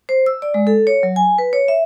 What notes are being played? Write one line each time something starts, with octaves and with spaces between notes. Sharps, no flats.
C5
E6
D5
G#3
A4
C#5
F#3
G#5
B4
C#5
E5